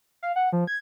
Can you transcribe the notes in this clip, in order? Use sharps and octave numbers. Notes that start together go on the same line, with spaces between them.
F5
F#5
F3
G#6